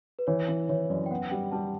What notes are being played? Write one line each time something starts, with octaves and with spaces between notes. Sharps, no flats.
B4
E3 C#5
E3
E3 C#5
F#2 D5
G5
B3 F#5
G3 G5
G3 A5